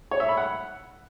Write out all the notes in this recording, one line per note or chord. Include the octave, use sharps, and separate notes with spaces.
C#5
E5
B5
F#5